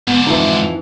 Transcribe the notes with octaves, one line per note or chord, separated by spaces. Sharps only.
G#2 D3 B3
F2 E3 D#4